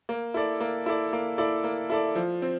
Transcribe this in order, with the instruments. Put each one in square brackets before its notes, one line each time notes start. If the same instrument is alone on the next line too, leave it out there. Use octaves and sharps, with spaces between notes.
[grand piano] A#3
E4 A4 D5
A#3
E4 A4 D5
A#3
E4 A4 D5
A#3
E4 A4 D5
F3
C4